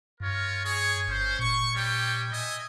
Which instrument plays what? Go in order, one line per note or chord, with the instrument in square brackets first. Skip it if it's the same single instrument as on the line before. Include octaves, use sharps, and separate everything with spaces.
[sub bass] G2 [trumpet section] F4 A#4 C#5
[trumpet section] G#4 C#5
[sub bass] G1 [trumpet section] C#4 C5
[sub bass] A#2 [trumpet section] C#6
[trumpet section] G3 C#5 G5
D#5 E5 G#5